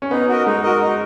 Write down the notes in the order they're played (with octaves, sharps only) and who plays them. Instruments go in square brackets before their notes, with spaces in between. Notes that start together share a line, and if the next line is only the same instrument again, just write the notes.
[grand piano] C#4
[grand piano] B3 [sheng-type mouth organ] D#4
[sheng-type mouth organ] F#4 A#4 D#5
[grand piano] G#3 [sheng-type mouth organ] D#4
[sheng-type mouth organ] F#4 A#4 D#5
D#4